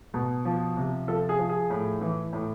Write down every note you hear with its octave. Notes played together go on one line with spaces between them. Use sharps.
B2
F3
C3
F3 A4
G#4
F3
G#4
A2
E3
A2